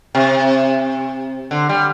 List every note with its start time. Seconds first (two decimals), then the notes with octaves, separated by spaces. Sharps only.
0.15 C3
1.51 D3
1.69 G3